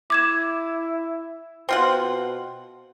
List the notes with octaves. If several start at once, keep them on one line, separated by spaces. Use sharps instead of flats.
E4 D6 G#6 E7
B2 C4 F4 F#5